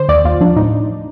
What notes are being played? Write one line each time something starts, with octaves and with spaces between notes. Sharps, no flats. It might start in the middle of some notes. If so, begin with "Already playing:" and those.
Already playing: D3 C5
D#2 D5
D#2 F4
F3 D4
A2 D#4